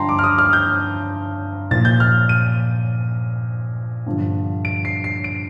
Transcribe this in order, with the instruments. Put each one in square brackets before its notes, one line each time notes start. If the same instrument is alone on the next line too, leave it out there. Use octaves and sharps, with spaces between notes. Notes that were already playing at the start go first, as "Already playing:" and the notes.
Already playing: [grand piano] G2 D3 F3 G5 A5 A#5 C6
D6
F6
D#6
F6
G6
A#2 F3 A6
G6
F6
D#7
G2 D3 F3
D7
C7
C7
D7